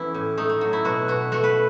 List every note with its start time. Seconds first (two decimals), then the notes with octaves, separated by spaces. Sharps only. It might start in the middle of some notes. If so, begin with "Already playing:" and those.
Already playing: E3 A3 B3 C#4 E4
0.14 A2
0.37 A3 D#4
0.49 A3
0.61 F#3
0.73 E4
0.85 B2 F#4
1.08 B2 F#4
1.32 A3 F#4
1.44 B4